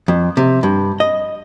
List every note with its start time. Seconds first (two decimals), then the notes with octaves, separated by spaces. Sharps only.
0.08 F2
0.37 C3
0.63 G2
1.00 D#5